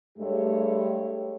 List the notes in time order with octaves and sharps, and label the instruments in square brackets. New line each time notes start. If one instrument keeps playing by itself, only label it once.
[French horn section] G2 G#3 A3 G4 C#5